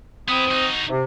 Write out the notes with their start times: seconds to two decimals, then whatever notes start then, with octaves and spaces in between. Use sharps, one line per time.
0.28 B3 C4 E4 D#6
0.51 D#4 F#4
0.89 C3